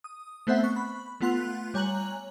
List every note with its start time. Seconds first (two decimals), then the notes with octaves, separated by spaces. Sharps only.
0.04 D#6
0.47 A3 B3 C4 C5 E5 F#5
0.64 C#6 F#6
0.76 B5
1.21 A3 B3 F4 F#5 C6 F#6
1.74 G3 C#5 G#5 A#5 F#6 F#7